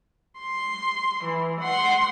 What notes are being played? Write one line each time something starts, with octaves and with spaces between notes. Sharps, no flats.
C6
E3
F#5 C6